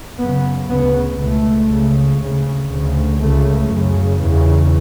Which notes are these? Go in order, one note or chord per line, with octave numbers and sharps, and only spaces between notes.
F#2 C#3 B3
D2 C#3 B3
C#2 B2 A3
C#2 C#3
D2 C#3
D2 C#3
C#2 C#3 A3
F#2 C#3
E2 C#3